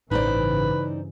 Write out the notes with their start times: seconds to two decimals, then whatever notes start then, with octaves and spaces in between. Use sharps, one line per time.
0.11 A1 G2 C#3 E3 D#4 B4 C5 D5